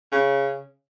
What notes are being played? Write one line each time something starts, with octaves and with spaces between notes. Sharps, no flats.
C#3